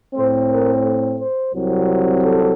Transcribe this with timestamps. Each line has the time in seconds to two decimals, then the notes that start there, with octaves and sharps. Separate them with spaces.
0.15 A2 A3 C4 C5
0.50 A#4
1.19 C5
1.54 C2 C3 F#3 C4
2.24 A4